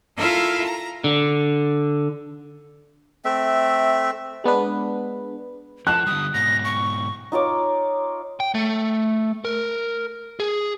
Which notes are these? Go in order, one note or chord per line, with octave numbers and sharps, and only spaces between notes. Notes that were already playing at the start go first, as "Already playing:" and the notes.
E4 F4 A4 A#4 E5 F5
A#5
D3
A3 C4 E5
G#3 B3 D4 B4
F3 A5 F#6
D3 G3 D#6
G#2 B2 A#6
C#6
D#4 F4 C#5 D6
G5
A3
A#4
G#4